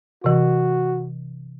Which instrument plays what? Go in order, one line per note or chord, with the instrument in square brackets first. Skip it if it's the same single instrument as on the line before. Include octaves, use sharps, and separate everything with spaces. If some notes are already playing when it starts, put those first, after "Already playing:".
[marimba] C3 E3 [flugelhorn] F#4